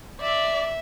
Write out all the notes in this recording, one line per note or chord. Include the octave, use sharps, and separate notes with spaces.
D5 E5